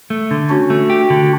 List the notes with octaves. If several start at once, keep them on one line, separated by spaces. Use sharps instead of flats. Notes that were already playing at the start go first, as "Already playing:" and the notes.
A3
D3
C#4 D4 F#4
A3
G4
D3